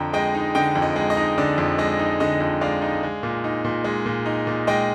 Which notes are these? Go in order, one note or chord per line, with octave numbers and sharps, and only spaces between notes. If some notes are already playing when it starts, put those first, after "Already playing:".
Already playing: F2 D3 G5 A#5
G#3 D#5 G5
D#4
D3 D#5 G5
F2
D#5
G#3
D#5
D#4
D3 D5
F2
G#3 D#5
D#4
D3 D#5
F2
G#3 D5 F5
D#4
G#3
A#2
D#4
A#2
G#3
A#2
D#4
A#2
G#3 D#5 G5